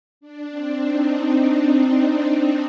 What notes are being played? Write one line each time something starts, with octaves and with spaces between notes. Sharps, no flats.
D4
C4
D#4